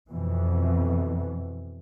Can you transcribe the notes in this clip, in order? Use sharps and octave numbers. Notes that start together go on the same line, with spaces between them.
F2 B2 E3